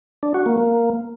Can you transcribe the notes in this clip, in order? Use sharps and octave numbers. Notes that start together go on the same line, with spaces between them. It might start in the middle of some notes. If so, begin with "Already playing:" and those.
D4
F#4
A#3
A#3